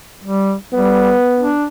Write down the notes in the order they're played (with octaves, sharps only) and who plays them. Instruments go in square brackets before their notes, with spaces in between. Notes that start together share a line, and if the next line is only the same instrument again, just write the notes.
[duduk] G3
[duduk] G3 [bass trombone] B3
[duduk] D4